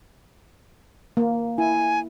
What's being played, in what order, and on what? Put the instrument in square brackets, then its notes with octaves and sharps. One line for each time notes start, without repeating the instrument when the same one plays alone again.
[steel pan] A#3
[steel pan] E4 [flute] G#5